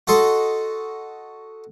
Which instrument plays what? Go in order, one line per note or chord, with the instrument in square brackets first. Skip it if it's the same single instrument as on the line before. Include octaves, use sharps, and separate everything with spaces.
[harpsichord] F#4 A4 D#5 C6